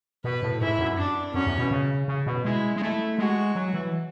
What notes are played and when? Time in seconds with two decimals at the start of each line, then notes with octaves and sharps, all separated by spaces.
0.24 B2 B4
0.43 A2
0.61 G#2 E4
0.79 F#2
0.98 D4
1.34 F#2 C#4
1.47 E2
1.59 B2
1.71 C#3
2.08 C#3
2.26 B2
2.45 G#3 E4
2.76 G#3
2.82 A3 E4
3.18 G#3 F#4
3.55 F#3
3.74 E3